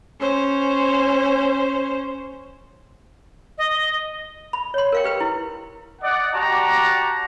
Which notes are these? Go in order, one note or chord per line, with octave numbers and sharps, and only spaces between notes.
C#4 C5
D#5
B5
C#5 C6
A#4 F5 G5
G4 B4 G5
E4
D5 D#5 F#5
F#4 G4 D5 F#5 A5 A#5